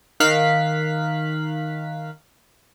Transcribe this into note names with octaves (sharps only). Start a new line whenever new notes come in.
D#3 A#4 F5 F#6 B6